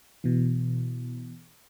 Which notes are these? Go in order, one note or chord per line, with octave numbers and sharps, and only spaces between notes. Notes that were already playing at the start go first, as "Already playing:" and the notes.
B2 E3